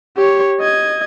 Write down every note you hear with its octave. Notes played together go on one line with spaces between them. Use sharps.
G4 C#5
D#5 G#6